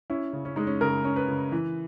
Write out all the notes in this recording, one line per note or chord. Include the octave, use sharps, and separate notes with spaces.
C#4 E4
C#3
C#4
G#3 D#4
C#4
C#3 A#4
C#4
B4
C#3
E3